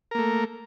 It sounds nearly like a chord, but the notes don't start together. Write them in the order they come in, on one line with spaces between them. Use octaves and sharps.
A#4 A#3 A3